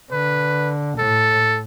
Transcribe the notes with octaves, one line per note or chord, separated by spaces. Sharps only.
D3 B4
A2 A4